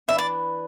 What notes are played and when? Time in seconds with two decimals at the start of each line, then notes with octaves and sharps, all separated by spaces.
0.08 E3 D4 B4 E5
0.18 D5